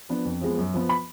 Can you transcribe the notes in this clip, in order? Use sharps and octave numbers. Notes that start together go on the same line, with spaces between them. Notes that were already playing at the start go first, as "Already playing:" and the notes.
F3 B3 D4
F2
F3 G#3 B3
F#2
F3 B3
B5